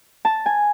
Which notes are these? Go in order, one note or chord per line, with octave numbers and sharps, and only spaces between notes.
A5
G#5